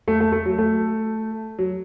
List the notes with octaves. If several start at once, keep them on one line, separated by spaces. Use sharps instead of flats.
A3
A3
A3
F#3
A3
F#3